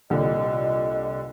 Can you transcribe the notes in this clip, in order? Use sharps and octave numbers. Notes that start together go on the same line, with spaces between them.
C2 A#2 D3 D#5